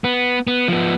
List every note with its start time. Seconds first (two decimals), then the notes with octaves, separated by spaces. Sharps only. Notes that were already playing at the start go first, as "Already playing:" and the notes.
0.04 B3
0.47 B3
0.68 F3 B3